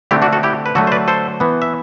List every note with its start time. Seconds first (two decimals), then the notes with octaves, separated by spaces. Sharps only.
0.11 D3 A3 C4 E4 G4
0.22 D4 F#4
0.33 F#4 A4
0.43 E4 G4
0.66 B4
0.75 D3 F#3 A3 F#4 A4
0.87 C5
0.92 B4 D5
1.08 A4 C5
1.40 E3 B3
1.62 E5